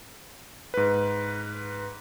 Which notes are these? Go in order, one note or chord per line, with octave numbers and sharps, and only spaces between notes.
G#2 B4